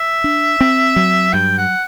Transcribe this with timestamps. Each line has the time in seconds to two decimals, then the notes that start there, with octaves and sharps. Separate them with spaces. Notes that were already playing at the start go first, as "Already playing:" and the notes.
Already playing: E5
0.24 D4
0.61 C4
0.96 F#3
1.33 G2 G5
1.58 F#5